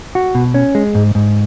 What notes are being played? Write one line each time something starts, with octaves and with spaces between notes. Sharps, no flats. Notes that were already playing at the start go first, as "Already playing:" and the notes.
F#4
B2
C#4
G#3
G#2
G#2